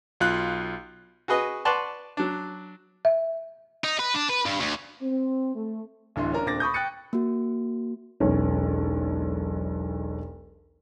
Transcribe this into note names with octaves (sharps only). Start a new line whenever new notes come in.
B1 F4 F#6
F#4 G#4 B4 D#5
B4 D5 F#5 A5 C6 C#6
F#3 D4
E5
D#4
B4
D4
B4
G2
D2
C4
A3
D1 D3 E3 C6
C#4 D4 A#4
D#1 C4 D4 D6 A6 A#6
B5 C#6 D#6 G6
G5 F#6 A6 C#7 D#7
A#3 F#4
E1 B1 C#4